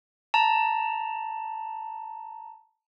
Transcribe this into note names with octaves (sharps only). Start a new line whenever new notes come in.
A5 A#5